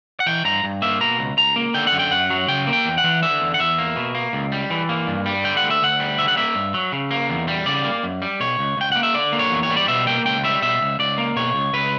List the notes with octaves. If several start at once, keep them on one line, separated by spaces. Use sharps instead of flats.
F#5
E3 G5
G2 A#5
G2
A#3 E5
B2 A#5
C#2
C#2 A#5
A#3
D3 G5
F#5
F#2
G5
F#2 F#5
F#3
C#3 G5
A#3
G5
E2
F#5
E3
D3 E5
E2
F#5
E2 E5
A#3
B2
A#3
C#2
G3
E3
A#3
G2
G3
D3 G5
F#5
D2
E5
D2 F#5
G3
D3 E5
F#5
A#3 E5
G2
F#3
C#3
A#3
E2
G3
C#3 D5
A#3
F#2
G3
B2 C#5
C#2
C#2 G5
A#3 F#5
E5
D3 D5
A#3
C#5
E2
C#5
G3
D5
B2 E5
A#3 G5
C#2 G5
G3 E5
B2 E5
C#2
C#2 D5
A#3
B2 C#5
C#2
C#2 B4